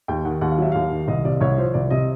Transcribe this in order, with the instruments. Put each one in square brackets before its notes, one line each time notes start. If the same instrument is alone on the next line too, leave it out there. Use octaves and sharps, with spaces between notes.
[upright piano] D#2 G5
D#3 F#5
D#2 F#5
F5
F#3 E5
D#2 F5
D#3
C2 D#5
C3 D5
C2 C#5
F3 C5
C2 D5
C3 D#5